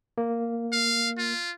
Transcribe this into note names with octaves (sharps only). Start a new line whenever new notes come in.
A#3
F5
F4